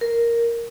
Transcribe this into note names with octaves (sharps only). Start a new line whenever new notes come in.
A#4